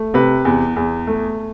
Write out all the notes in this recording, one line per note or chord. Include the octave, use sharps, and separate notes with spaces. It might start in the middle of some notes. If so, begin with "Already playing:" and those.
Already playing: A3
C3 B4
E2
E2
A3